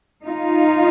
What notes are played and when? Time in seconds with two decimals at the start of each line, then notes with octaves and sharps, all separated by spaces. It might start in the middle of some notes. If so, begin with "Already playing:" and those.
0.24 D#4 F4